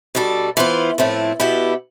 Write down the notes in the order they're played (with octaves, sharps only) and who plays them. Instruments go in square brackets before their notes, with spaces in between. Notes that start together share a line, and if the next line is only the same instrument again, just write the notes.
[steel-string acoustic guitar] B2 G3 D4 A4
E3 B3 F4 C5
A2 F3 A3 C4 E4
B2 B3 E4 G4